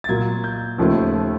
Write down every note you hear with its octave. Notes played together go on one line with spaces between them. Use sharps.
A6
A#2 F#3 A#3 G#6
G6
D#2 C#3 F3 A3